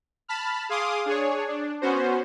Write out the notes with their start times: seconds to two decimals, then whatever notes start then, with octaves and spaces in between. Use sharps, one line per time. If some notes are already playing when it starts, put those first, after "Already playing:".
0.28 A5 B5 F6
0.69 G#4 F5 C6 D6 D#6
1.06 D4 G#4 C#5
1.48 D4
1.82 B3 C#4 F#4 C5